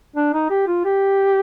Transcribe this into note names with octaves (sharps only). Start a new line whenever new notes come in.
D4
D#4
G4
F4
G4